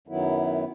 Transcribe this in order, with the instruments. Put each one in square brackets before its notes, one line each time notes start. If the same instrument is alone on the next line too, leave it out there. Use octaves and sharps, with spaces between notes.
[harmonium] F#2 D#3 F#3 B3 E4